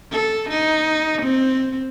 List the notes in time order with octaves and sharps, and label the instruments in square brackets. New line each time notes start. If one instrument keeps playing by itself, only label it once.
[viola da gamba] A4
D#4
C4